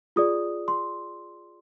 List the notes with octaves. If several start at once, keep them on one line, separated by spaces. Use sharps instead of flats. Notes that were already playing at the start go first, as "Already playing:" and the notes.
F4 G#4 D5 D#6
C6